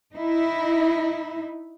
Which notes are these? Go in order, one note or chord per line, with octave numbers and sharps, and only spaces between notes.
D#4 E4